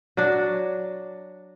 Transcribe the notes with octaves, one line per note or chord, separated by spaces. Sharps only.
F#3 D4